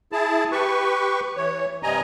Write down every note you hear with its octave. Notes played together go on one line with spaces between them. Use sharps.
E4 G#4 A5
G4 B4 C#6
E3 C#5
G2 C3 G3 D#5 G#5 A#5